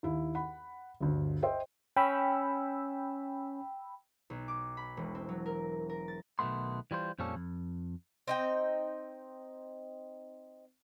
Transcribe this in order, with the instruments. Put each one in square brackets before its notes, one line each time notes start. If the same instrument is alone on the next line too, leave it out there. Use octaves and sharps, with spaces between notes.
[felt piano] D#2 E4
F#5 B5
G1 D2
C5 D#5 E5 G5
[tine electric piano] C#4 [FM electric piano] G5 B5 E6
[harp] B1
D6
B5
E1
C4
F#3
A#4
A#4
A6
[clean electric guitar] B1 B2 D#3 A3 B3 C6
E3 G3 F4 C5
F2 A#2 F3 G3 C#4 A4
F2
[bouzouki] C4 D#4 G5